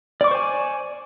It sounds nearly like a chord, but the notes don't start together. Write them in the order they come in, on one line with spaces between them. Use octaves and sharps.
D5 D6 C#6 C5 G#5